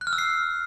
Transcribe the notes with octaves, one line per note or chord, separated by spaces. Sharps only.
F#6
F6
E6
C7